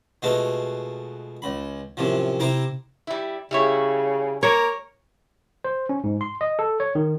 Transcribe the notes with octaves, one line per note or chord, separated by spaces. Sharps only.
B2 G#3 A3 B3 F4 F#4
C#2 B5
F#2 A2 C3 F3
C3 E4 C5 G5 A#5 D6
G3 E4
C#3 G3 E4 C#5
A#3 A#4 C#5
C5
C#4
G#2
C6
D#5
A4
C#5
D#3